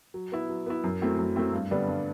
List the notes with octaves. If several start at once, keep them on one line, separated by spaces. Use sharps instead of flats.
F#3
B3 E4
F#3
B3 E4
F#2
F#3 A3 C4 E4
F#2
F#3 A3 C4 E4
G2
D3 G3 B3 D4
G2